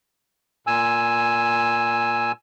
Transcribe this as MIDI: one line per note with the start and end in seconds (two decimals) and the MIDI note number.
0.67 2.32 46
0.67 2.32 80
0.67 2.32 88